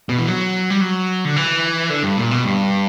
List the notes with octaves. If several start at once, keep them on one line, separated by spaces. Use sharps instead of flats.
B2
E3
F#3
G3
F#3
D3
E3
D3
G2
A#2
B2
G2